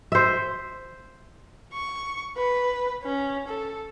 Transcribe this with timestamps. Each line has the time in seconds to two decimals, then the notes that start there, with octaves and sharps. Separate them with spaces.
0.12 C5 E5
1.73 C#6
2.37 B4
3.04 C#4
3.48 A4